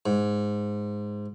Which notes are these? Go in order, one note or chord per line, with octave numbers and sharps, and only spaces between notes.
G#2